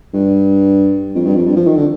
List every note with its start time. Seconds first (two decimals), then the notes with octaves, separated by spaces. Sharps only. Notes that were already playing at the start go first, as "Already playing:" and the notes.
0.13 G2
1.15 F2
1.26 G2
1.36 F2
1.46 G2
1.56 F3
1.67 D#3
1.76 D3